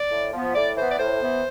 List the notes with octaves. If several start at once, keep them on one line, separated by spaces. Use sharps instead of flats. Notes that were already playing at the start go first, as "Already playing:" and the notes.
Already playing: D5
A2
F3 B3
A2 D5
E3 B3 C5
D5
A2 C5
E3 B3